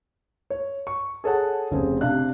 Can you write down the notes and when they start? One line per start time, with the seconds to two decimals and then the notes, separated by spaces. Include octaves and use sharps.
0.50 C#5
0.87 C#6
1.24 G#4 A4 C#5 F#5 A5
1.71 F1 C#3 C4 G#4
2.01 C3 D4 F5 F#6